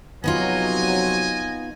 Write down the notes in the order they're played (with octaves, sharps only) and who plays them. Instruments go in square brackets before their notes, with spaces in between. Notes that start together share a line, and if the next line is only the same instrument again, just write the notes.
[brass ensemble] F2 C3 F#3 [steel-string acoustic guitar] B3 D#4 F4 [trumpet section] D#5 G#5